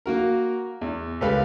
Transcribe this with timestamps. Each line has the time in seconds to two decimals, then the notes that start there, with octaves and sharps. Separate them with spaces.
0.06 A#3 F#4 A#4
0.81 E2
1.21 C#2 G4 A4 B4 F5